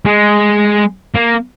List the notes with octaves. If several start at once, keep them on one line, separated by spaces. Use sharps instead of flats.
G#3
A#3